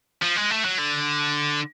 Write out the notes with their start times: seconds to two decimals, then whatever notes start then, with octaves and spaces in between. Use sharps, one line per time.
0.22 F3
0.37 G#3
0.51 A3
0.65 F#3
0.79 D3